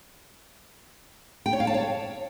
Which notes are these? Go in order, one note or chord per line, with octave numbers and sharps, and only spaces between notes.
G5
C#5
F5
A5
C#5